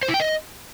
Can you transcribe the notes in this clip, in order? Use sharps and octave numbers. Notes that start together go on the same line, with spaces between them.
C5
E4
G5
D#5